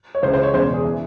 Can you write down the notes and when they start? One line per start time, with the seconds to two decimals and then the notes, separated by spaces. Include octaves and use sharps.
0.15 C#5
0.22 C#2 C#3 E3 C5
0.33 C5
0.43 C#5
0.53 E1 E2 C#3 C5
0.74 G#4
0.84 E3